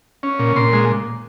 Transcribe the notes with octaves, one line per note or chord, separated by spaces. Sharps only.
C#4
A#2
A#2 C6
G#3